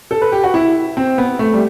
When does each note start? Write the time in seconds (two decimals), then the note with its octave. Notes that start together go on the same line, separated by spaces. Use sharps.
0.11 A4
0.22 B4
0.32 G4
0.44 F#4
0.54 E4
0.97 C4
1.18 B3
1.39 A3
1.54 G3